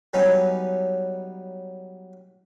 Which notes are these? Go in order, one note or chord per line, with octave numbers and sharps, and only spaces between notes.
F#3 G3 B3 C#4 D#4